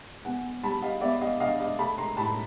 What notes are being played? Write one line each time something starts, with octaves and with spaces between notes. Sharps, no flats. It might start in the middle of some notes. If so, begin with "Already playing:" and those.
B3 F#5 G#5
G3 A5 B5
D#5 F5
B3 D5 E5
D#5 F5
D4 D#5 F5
D#5 F5
A3 A5 B5
A#5 C6
A2 A5 B5